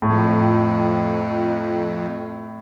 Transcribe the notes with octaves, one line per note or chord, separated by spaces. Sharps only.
F2 A2